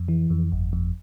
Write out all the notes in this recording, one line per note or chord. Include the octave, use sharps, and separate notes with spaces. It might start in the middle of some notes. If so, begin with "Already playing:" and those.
Already playing: F2
E3
F2
G1
F2